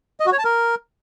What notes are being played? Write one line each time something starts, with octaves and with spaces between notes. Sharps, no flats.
D#5
F#4
C#5
A5
A#4